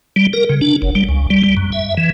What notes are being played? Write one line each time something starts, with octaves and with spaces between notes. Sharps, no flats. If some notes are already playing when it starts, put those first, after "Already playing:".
G3
A#4
C#3
D4
F#1
G3
C#2
G3
G3
F#2
E5
E3